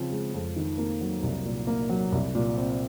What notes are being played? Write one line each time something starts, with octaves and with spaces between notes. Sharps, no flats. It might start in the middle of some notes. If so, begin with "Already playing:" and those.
Already playing: C#3 F3 C4
G#3
F2
D#3
A#3
F#3
C2
A#2
A#3
F#3
C2
A#2
C4